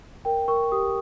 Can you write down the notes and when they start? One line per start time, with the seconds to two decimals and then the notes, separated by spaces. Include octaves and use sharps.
0.25 A#4 G5
0.48 A#4 C#6
0.72 G4 D#6